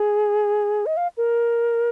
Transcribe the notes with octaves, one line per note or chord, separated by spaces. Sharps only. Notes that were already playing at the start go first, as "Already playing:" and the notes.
Already playing: G#4
D#5
F5
A#4